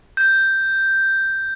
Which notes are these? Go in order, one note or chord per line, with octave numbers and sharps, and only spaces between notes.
G6